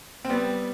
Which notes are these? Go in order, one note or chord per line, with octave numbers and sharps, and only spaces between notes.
C4
G3 B3